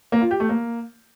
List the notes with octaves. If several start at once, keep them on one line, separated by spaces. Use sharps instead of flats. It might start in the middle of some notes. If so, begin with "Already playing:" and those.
A#3
F4
G4
A3
A#3